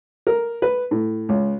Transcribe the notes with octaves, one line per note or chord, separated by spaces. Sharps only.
A#4
B4
A2
C#2